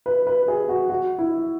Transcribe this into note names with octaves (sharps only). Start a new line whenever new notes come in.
B4
B4
G#4
F#4
F#4
E4